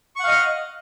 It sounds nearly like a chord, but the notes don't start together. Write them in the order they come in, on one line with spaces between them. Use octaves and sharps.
C#6 F#5 F5 D#5 F6